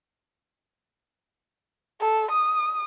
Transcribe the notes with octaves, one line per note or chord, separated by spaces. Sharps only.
A4
D#6